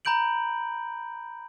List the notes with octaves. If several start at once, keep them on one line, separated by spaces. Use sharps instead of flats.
A#5 B5 G6 D7 F#7